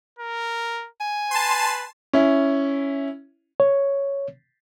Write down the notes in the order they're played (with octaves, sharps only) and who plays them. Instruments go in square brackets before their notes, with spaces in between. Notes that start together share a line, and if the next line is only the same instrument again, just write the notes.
[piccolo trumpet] A#4
[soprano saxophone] G#5
[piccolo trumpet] B4 [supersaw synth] A5 C6
[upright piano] C#4 E4
[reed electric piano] C#5